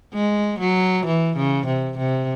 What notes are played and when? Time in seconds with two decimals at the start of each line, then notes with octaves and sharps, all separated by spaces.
0.14 G#3
0.59 F#3
1.06 E3
1.37 C#3
1.67 C3
1.98 C3